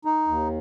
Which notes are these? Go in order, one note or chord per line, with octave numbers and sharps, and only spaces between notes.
D#4
D#2